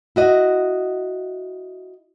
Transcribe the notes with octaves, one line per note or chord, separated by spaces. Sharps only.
E4 F#4 D#5